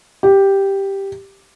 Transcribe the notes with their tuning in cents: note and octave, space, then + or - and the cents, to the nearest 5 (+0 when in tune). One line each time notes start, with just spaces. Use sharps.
G4 +0